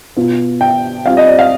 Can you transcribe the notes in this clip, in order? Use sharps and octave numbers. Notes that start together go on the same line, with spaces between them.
B2 B3 F4
G5
G3 C4 F4 F5
D#5
D5
F5